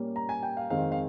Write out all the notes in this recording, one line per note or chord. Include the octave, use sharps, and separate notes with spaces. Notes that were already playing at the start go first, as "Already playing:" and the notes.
Already playing: A#2 G3 A#3 C#4
A#5
G#5
G5
F5
F2 D#3 G#3 C4 F5
F5